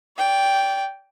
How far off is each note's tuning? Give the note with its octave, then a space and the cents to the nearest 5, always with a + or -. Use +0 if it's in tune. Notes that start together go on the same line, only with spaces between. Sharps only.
D5 -35 G5 +0